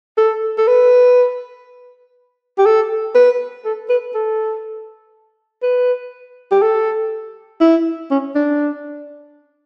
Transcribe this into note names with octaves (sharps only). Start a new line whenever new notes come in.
A4
A4
B4
G4
A4
B4
A4
B4
A4
B4
G4
A4
E4
C#4
D4